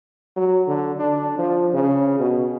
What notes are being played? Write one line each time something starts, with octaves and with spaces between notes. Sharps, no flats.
F#3
D3
D4
F3
C#3
B2